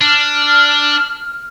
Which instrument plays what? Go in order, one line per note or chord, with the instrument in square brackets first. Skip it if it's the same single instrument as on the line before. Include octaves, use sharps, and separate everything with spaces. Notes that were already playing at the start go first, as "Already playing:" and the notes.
[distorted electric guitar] D4 [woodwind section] F6